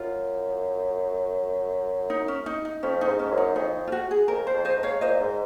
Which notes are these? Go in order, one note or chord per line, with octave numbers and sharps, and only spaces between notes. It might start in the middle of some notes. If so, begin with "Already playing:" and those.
Already playing: F#2 F4
D#4
C#4
D#4
D#4
F2 C#4
D#4
G#2
C#4
F#2
D#4
F2 D#4
F4
F#4
G#4
F2 A#4
C5
F2
C5 D#5
G#2
C#5 F5
A#2 C5 D#5
G#2